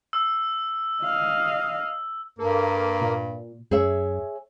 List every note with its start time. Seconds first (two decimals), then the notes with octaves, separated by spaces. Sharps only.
0.13 E6
1.03 D#5 F5
2.39 G2 A#3 A4
3.01 A#2
3.71 F#2 G#4 C#5 E5